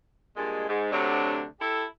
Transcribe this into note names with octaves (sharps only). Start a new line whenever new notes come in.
G2 A#2 G#3
G#2
D2 C3 F#3 D4
E4 G4 A4